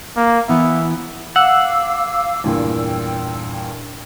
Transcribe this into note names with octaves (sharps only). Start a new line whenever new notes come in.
A#3
E3 B3 E5
F5 F#5 D6 E6
E2 G2 A#2 G5